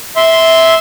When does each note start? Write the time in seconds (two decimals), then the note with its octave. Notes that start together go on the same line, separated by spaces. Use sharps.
0.16 E5 C6